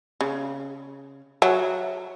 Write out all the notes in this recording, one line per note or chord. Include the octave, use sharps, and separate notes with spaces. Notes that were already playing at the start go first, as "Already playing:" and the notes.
C#3
F#3 E5